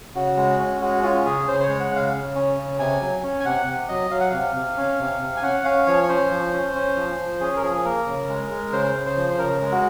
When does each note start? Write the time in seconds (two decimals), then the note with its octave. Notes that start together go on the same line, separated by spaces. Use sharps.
0.15 C#3 F#4
0.37 G#3
0.59 C#4
0.81 G#3 F#4
1.03 C#4 F4
1.25 C#3 G#4
1.47 C#3 C5
1.60 C5
1.63 C#5
1.69 G#3
1.80 F#5
1.91 C#3
1.96 F5
2.14 C#3
2.35 C#4
2.57 C#3
2.79 C3 G#5
3.01 F#3
3.23 C#4
3.40 G#5
3.45 C3 F#5
3.66 C3
3.88 F#3 D#5
4.10 F#3 F5
4.20 F#5
4.30 C3 F5
4.56 C3
4.77 C#4
5.00 C3
5.21 C3
5.37 G#5
5.43 C#4 F#5
5.64 C#4 F5
5.86 F3 C#5
6.04 C#5
6.09 C#4 C5
6.31 F3
6.53 C#4
6.75 C#4
6.96 F3
7.19 F3
7.41 C#4 G#4
7.56 A#4
7.62 F3 G#4
7.85 A#3 A#4
8.06 C#3
8.29 G#3
8.51 G#3
8.72 C#3 C5
8.95 C#3
9.06 C5
9.17 F3
9.30 C5
9.38 C#3 A#4
9.61 G#3
9.72 F#4